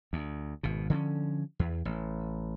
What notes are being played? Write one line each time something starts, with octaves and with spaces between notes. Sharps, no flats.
D2
G#1 B2
D3 F3 A3 C#4
E2
A1